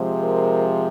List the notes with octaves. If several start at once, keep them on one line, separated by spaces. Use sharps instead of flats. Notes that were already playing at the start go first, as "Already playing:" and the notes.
Already playing: C3 F3 G#3
A#4